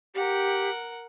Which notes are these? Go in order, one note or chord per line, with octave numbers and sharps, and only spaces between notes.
G4 A#4 F#5